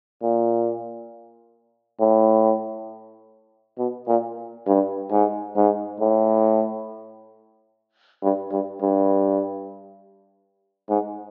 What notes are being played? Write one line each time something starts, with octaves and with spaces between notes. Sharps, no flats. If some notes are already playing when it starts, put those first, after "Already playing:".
A#2
A2
B2
A#2
G2
G#2
G#2
A2
G2
G2
G2
G#2